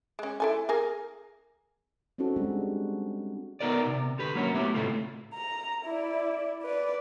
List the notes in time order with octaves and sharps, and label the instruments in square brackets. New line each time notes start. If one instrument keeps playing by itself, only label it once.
[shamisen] G#3 C#4
E4 A4 G#5
G#4 A#4 G#5
[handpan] C4 C#4 D#4 F#4 A4
G3 G#3 D4 G#4 A4
[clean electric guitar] B3 D#4 A#4 B4 D5
C3
D3 G4 B4
F#3 A#3 C#4 F#4
A3 B3 E4 G4 B4
A2 C#3 G#3 A3 C4 F4
[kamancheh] A#5
E4 D5
B4 D5